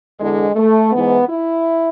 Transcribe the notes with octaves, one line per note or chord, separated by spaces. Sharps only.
E2 D3 G#3
A3
G#2 E3 B3
E4